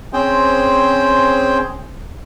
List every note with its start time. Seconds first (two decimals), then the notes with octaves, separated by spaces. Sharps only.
0.13 C4 C#4 G#4 C5 G5